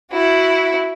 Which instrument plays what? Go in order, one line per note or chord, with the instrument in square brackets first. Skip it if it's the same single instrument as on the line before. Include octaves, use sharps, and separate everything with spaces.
[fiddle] E4 F#4